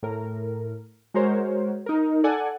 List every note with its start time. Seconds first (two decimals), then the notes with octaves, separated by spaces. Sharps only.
0.03 A2 A#4
1.14 G#3 F#4 A#4 C5 C#5
1.86 D#4 A#4
2.24 A4 D5 F#5 G#5